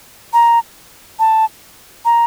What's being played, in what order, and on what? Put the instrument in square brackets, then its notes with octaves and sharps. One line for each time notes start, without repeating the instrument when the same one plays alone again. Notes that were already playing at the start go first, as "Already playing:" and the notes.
[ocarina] A#5
A5
A#5